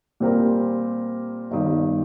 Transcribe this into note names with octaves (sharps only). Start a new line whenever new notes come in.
A#2 G3 C4 G4 A#4
G1 G2 D#3